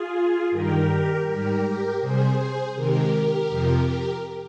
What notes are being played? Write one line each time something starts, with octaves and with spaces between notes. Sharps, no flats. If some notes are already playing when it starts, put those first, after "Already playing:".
Already playing: F4 G#4
G2 D#3 G3 G4 A#4
G#2 G3 G4 A#4
C3 G3 G#4 C5
C3 D#3 G#3 G4 A#4
F2 C3 F3